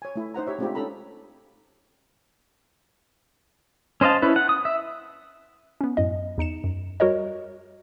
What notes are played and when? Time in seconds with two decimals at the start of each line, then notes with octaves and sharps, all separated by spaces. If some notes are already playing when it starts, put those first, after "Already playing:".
0.02 C#5 G#5
0.16 A3 E4
0.34 D#4 C5 F#5 A#5
0.47 G4 C#5 E5
0.59 G#3 A3 C4 D4 F4 G4
0.75 C#4 D#4 A4 A#5 B5
4.01 C#4 C5 D#5 F5 A5
4.22 C#4 E4 B4
4.36 F#5
4.49 D#6
4.65 E5
5.81 B3 C#4
5.97 F#2 A2 D#5
6.38 E2 D#4 C#7 E7
6.64 F#2
7.00 G3 F#4 A#4 C#5 D#5